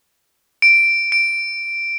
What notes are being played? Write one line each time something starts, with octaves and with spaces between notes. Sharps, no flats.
D7
D7